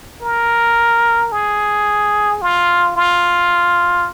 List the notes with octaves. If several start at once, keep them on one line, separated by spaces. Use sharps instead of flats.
A#4
G#4
F4
F4